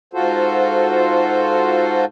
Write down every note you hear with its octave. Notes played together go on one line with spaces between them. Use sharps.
G#2 F4 F#4 A4 C5